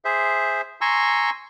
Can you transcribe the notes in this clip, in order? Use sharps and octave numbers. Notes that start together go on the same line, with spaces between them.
G#4 C5 E5
G#5 A#5 C6 C#6 E6